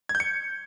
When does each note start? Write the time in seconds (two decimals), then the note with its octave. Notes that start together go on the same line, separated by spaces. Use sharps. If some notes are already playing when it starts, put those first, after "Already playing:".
0.09 G#6
0.15 G6
0.20 C#7